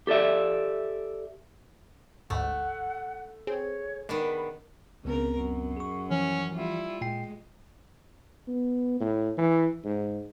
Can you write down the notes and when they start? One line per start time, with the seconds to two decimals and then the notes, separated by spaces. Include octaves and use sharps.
0.07 G4 A4 D5 E5
2.30 G1 D2 G#2 A3 F#5
3.47 C4 G#4 C#5
4.09 D#3 G#3 B3 D4 B5
5.05 C#2 C#3 B3 C4 A#4
5.37 F#2
5.77 G#4 C#6
6.10 E3 F3 C#4
6.54 G3 E4 F4
7.01 A#2 G#3 G5 C7
8.48 B3
9.00 A2
9.38 E3
9.85 G#2